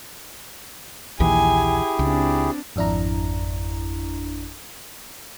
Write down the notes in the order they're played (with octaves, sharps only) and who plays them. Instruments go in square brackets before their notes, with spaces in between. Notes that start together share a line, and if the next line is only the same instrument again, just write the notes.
[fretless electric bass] A#1 D#2 E3 [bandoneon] E4 G4 G#4 [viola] G#5
[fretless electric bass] C#2 [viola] C4 D4
[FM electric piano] G#1 F2 D4 E4 A#5